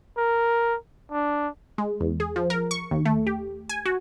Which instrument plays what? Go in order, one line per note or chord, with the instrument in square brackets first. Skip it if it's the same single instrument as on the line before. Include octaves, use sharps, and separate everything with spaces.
[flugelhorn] A#4
D4
[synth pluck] G#3
E2
G#4
F3
A#4
C#6
D#2
A3
G4
G#5
F#4